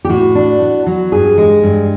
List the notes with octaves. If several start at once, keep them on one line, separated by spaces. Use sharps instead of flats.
G4
A2 F#4
D4
B3
F#3
G2 G#4
G#3
G2